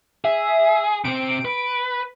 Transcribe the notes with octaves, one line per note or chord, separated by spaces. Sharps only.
G#4 E5
C3 C4 D7
B4